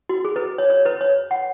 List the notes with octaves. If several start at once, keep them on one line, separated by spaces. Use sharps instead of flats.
F#4
G#4
B4
C#5
C#5
B4
C#5
F#5